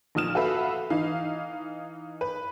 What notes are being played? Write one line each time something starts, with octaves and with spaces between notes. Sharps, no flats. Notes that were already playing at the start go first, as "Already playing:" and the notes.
A#1 A#2 D#6 F6 E7
F#4 A4 B4 E5 F5
E3 D#4 F5
B4